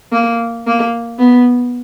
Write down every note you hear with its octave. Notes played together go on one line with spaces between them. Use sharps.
A#3
A#3
B3